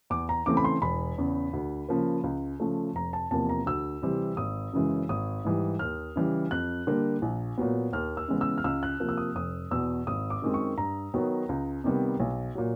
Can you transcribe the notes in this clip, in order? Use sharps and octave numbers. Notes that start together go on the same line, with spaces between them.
E2 D6
A#5
C#3 E3 A3 C4 D6
B5
C6
E1 B5
E2 C#3
D2
C#3 F3 A#3
C#2
C#3 F3 A3
F1 A#5
A5
E2 C3 F3 A#3 A5
A#5
D2 E6
C3 E3 G3 C4
G#1 D#6
F#2 C#3 E3 G#3
G#1 D#6
G#2 E3 G3
D#2 F6
C#3 E3 G3
F2 F#6
D3 G3 A#3
A#1
A#2 F#3 B3
D#2 F6
E6
C#3 E3 G#3 B3
E6
F6
C#2 E6
F#6
C3 F3 A#3
E6
D#6
F1 D#6
E2 B2 E6
G#1 D#6
D6
F#2 D#3 G#3 C4
C#6
G2 A#5
D#3 F#3 B3
C#2
C3 D#3 G3 B3
B1
A#2 F#3